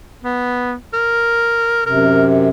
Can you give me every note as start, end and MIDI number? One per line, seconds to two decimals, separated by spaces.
0.24 0.74 59
0.94 1.85 70
1.86 2.49 42
1.86 2.49 48
1.86 2.26 70